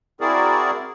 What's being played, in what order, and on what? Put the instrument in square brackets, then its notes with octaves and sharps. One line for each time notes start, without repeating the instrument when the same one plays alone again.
[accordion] C4 E4 F#4 G#4 A#4 D5